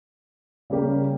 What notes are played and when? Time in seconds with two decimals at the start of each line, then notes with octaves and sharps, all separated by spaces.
0.70 C#3 G3 A#3 C#4 G4